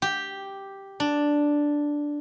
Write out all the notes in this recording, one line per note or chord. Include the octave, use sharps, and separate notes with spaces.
G4
D4